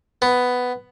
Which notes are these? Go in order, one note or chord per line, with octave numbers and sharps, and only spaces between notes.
B3